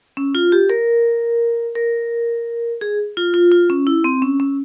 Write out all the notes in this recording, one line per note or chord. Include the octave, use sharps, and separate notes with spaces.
C#4
F4
G4
A#4
A#4
G#4
F4
F4
F4
C#4
E4
C4
C#4
C#4